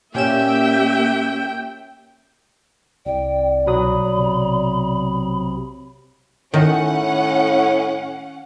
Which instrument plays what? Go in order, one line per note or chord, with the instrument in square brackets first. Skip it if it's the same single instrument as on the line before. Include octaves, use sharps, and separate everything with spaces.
[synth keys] A#2 C#4 E7 [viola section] A#3 G4 E5 [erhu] G5
[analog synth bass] C2 [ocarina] D5 [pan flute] G5
[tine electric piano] B1 F#3 D#6 [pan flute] B5
[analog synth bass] C3
[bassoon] A2 [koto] D#3 D#4 [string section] C#4 F#5